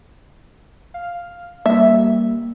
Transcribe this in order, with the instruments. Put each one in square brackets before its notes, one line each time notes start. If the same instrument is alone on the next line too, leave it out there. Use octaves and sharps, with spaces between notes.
[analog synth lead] F5
[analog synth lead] G3 [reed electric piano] A#3 [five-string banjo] E5